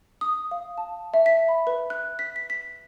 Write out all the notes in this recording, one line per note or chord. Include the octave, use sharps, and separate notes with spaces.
D#6
F5
A5
E5
B6
B5
B4
F#6
B6
B6
B6